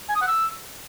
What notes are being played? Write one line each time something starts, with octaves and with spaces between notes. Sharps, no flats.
G#5
D#6
F#5
E6